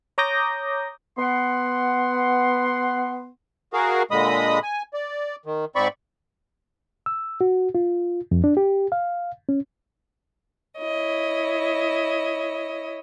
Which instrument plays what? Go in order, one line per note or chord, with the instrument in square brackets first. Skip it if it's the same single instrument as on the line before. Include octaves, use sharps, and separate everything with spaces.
[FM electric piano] C#5 A#5 D6 D#6 G6 A#6
[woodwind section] B3 F#5 C6
[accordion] F#4 G#4 A#4 F5
A#2 D3 G#3 D#5 B5 D#6
G#5
D5
D#3
G#2 C4 D5 B5 C#6
[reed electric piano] E6
F#4
F4
F2
D4
G4
F5
C#4
[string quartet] E4 C#5 D#5